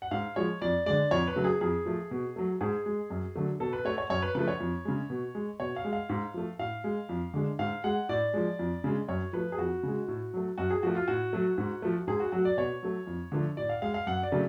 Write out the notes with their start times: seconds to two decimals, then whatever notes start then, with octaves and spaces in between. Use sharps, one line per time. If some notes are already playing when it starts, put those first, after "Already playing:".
0.02 F#5
0.11 G#2 F5
0.36 F3 G#3 C#5
0.61 F2 D5
0.86 D3 G#3 D5
1.11 F2 C#5
1.28 B4
1.36 C#3 F#3 A3
1.44 G#4
1.61 F2 G#4
1.86 F3 A3
2.11 B2
2.36 F#3 A3
2.61 G#2 G#4
2.86 G#3
3.10 F#2
3.35 D3 F#3 A3
3.60 B2 A4
3.73 B4
3.85 A3 C#5
3.98 C#5
4.10 F#2 C#5
4.22 B4
4.35 C#3 F3 A3 B4
4.48 C#5
4.60 F2
4.85 C#3 G#3
5.10 B2
5.35 G#3
5.60 B2 C#5
5.76 F5
5.85 G#3
5.93 F5
6.09 G#2
6.34 F3 A3
6.59 A2 F5
6.84 G#3
7.09 F2
7.34 D3 G#3
7.59 G#2 F5
7.84 G#3 F#5
8.09 A2 D5
8.34 F3 G#3
8.59 F2
8.84 C#3 G#3
9.08 F#2 C#5
9.33 F3 A3 B4
9.52 G#4
9.58 F2 F#4
9.83 C#3 G#3
10.08 A2
10.34 F#3 A3
10.58 F#2 F#4
10.70 G#4
10.83 F3 A3 F#4
10.95 F4
11.08 A2 F#4
11.33 F#3 A3
11.58 G#2
11.82 F3 A3
12.07 G#2 G#4
12.20 F#4
12.32 F#3 A3 F#4
12.45 D5
12.58 B2 C#5
12.83 F#3 A3
13.07 F2
13.32 D3 F3 A3
13.57 A2 D5
13.69 F5
13.82 G#3 F5
13.94 F5
14.07 F#2 F#5
14.23 D5
14.32 C#3 F#3 A3